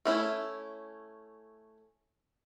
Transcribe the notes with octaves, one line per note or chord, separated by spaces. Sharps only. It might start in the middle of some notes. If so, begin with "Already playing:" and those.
A3 C#4 E4